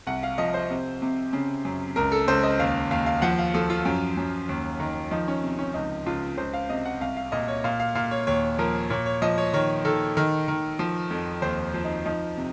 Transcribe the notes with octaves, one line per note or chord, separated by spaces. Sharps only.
C2 F#5
F5
F3 D#5
C5
C3
C3
C#3
F#2
C#2 A#4
A4
C#2 C5
D#5
D#2 F5
D#2 F5
F5
F3 F#5
F5
F3 A4
F4
F#2
F#2
D#2
D#3
F3 D#4
C#4
C3
C#4
C#2 D#4
C#2 F4
C#2 C5
F5
C3 D#5
F#5
C2 F5
F5
A#2 D#5
C#5
A#2 F5
F5
A#2 F5
C#5
D#2 C#5
F3 A#4
A#2 C#5
C#5
F3 D#5
C#5
D#3 C#5
D#3 A4
D#3
D#3
F3
F2
D#2 C5
F3
D#4
F3 D#4
C3